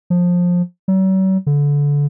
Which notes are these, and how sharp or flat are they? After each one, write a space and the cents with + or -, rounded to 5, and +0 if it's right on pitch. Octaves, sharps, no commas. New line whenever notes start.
F3 +20
F#3 +45
D3 -25